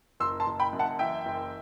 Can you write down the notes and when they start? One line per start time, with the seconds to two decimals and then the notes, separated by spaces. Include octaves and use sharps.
0.20 F#1 C6 E6
0.40 A5 C6
0.47 F#1
0.60 G5 B5
0.73 F#2
0.79 F#5 A5
0.99 E3 E5 G5
1.26 F#1